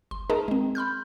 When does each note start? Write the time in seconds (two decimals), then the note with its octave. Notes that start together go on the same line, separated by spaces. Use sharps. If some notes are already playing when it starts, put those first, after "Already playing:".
0.11 G1 C6
0.30 D#4 G#4 A#4 D#5 A5 A#5
0.48 G#3 C4
0.75 B5 C6 F6 G6